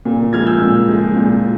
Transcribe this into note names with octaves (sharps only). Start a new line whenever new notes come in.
A#2
F3 G#3 F6 G#6
E6 G6
A#2
F3 G#3
A#2